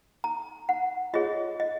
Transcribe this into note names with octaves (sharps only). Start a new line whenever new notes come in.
A#5
F#5
F4 G#4 C#5 D#5
D#5